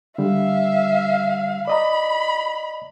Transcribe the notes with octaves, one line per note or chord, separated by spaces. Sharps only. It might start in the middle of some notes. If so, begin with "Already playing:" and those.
D3 G3 E5 F5
D5 D#5 A#5 B5